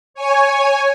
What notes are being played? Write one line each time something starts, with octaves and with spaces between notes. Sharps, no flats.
C#5 G#5